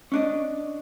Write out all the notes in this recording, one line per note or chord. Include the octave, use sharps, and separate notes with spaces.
C#4 D4 D#5